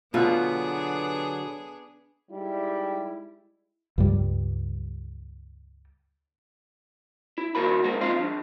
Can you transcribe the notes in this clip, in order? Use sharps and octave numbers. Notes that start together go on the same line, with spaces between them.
B2 D3 F#3 B3 D4 F4 G#4 C6
G3 G#3 D#4 E4
C#2 G2 G3
E4
D#3 A#3 F#4 A#4 B5
E2 G#3 A#3 B3
F2 D#4 F4 D#5 F5 C6
F3 D4